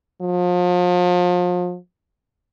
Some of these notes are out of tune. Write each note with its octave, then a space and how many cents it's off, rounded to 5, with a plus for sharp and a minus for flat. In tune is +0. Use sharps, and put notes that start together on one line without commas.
F3 +35